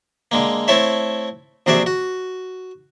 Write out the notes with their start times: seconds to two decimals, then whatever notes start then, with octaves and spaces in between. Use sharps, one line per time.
0.31 D3 G#3 A#3
0.68 A3 C4 E4 A4 C#5 E5
1.66 A#1 C3 F#4 G#4 D5 E5
1.86 F#4